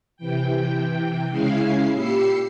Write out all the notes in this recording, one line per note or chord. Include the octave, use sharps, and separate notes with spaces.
C3 E3 G5
C#3 G#3 C#4 E4 F5 C7
A#2 G4 B5 E6 C7 C#7